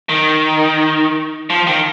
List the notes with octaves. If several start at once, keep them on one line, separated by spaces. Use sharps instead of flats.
D#3
F3
D#3